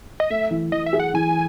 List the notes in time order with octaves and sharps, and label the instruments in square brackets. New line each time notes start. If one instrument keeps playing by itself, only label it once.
[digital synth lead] D#5
[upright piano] A3 [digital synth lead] E5
[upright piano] E3
[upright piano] E3 [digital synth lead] D#5
[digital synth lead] E5
[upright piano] G#4
[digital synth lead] F#5
[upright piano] E3 [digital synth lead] G#5